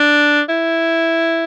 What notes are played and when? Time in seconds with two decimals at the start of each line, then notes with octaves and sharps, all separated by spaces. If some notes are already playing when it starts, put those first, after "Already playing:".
Already playing: D4
0.49 E4